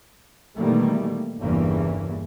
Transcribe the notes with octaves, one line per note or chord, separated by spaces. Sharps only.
B2 D#3 E3 G3 A3 A#3
G1 E2 G2 C#3 E3 A#3